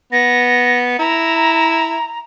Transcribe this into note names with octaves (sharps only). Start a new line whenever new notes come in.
B3 A#6
E4 A#5